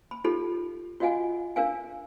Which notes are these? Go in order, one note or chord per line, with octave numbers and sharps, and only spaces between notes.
B5
D#4 F4 G4 A4 B5
F4 F#4 D#5 F5 F#5 G#5
D4 A#4 F5 G#5